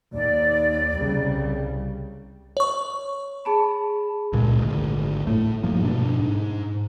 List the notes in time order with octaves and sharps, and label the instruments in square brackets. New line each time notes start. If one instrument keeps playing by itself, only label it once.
[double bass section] D#2 [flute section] D5
[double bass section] C2 C#3 G3
[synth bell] C#5 C#6
[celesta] G#4 A5 B5
[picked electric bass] C#2 A#2 F#3 G#3
G#1 D2
A2 A3
G2 F3 A#3
G2 B2 D4
G#2